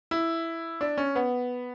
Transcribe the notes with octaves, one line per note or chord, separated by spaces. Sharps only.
E4
D4
C#4
B3